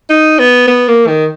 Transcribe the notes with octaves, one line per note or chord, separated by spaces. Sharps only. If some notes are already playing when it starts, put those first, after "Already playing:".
D#4
B3
B3
A#3
D#3